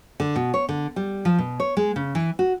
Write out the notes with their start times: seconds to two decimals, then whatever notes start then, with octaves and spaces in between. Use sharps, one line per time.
0.20 D3
0.36 B2
0.54 C#5
0.69 D3
0.96 G3
1.25 F3
1.38 B2
1.60 C#5
1.77 G#3
1.96 C#3
2.15 E3
2.39 F#4